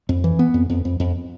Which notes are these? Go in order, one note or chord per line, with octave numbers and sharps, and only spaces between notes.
F2
E3
B3
F2
F2
F2
F2